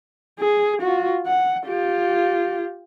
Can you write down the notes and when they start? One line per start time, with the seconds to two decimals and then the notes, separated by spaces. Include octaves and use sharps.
0.39 G#4
0.81 F4 F#4
1.26 F#5
1.66 F4 G4